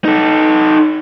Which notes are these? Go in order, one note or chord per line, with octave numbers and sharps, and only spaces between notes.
D#4 A4